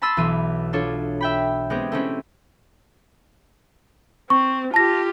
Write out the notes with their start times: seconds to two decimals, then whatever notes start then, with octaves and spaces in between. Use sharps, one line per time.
0.02 A5 B5 C6 E6 A6 D#7
0.17 B1 E3 D#7
0.73 D4 F4 A4 C#5
1.21 E5 G5 B5
1.70 G#3 B3 C4 G4 G#4
1.92 A3 C4 C#4 E4
4.30 C4 C#6
4.74 F4 G4 A5 A#6